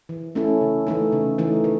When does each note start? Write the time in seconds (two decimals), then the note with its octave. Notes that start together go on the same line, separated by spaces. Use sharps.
0.09 E3
0.35 A3 C#4 E4 A4
0.61 C#3
0.87 E3 A3 D#4
1.12 C#3
1.38 E3 A3 D#4
1.64 E3